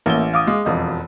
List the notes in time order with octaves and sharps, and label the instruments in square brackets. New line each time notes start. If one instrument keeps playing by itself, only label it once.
[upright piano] A1 G7 [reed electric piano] A#3 E5
[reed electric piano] F5 D6 D#6
[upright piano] G#3
E1 F2 D#5